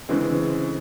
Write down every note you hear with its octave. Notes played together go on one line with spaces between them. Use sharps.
D2 C#3 E3 G#3 C4